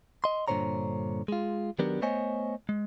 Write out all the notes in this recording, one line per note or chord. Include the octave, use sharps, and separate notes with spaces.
D#5 C6
G2 A#2 D3 C5 C#5 A#5
G#3 F4
D#3 F#3 B3 D4 G4 A#4
A3 B3 C5 C#5 D#5 G#5
G#3